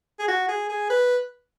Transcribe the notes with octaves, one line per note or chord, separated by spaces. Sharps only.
G#4
F#4
G#4
G#4
B4